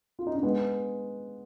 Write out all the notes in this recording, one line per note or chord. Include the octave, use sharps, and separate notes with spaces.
F4
D#4
D4
G#3 B3